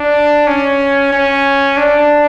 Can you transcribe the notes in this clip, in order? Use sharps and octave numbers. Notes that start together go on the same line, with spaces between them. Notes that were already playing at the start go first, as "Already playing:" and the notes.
Already playing: D4
C#4
C#4
D4